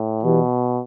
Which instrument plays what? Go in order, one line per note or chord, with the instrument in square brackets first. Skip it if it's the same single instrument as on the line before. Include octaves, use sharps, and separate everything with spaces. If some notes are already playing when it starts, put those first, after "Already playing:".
Already playing: [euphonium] A2
[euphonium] B2 [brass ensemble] E3 G3